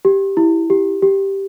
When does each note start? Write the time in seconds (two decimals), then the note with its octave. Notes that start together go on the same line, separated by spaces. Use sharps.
0.05 G4
0.37 E4
0.70 G4
1.02 G4